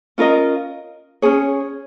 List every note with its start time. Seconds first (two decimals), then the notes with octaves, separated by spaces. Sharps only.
0.18 C#4 F4 A#4 D#5
1.22 C#4 G#4 C#5